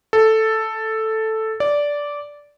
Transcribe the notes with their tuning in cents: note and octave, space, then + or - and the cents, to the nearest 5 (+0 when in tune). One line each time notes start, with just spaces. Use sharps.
A4 +0
D5 -10